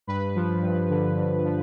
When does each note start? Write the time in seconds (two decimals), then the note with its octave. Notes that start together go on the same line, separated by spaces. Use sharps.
0.07 G2 B4
0.35 F3
0.62 G2
0.90 D3
1.17 G2
1.44 F3